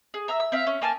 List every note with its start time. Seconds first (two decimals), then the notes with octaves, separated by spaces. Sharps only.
0.14 G#4
0.28 E5 A#5 E6
0.40 E6
0.52 C4 E5 F5
0.67 C#4
0.82 A#3 G#5 A5 F6